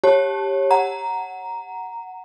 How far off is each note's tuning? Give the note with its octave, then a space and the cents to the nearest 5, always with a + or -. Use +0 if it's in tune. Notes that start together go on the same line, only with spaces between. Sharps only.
G4 +10 C#5 -15 A5 +0
F#5 +0 A#5 +0